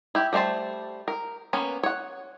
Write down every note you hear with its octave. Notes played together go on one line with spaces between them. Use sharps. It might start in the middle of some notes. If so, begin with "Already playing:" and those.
E4 G4
G3 A3 D4 C5 A5
A#4
A#3 B3 C#4
C#5 F#5